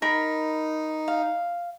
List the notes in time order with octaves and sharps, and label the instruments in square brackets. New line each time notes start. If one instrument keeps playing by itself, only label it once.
[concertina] D#4 [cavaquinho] A#4 B5
[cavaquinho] F5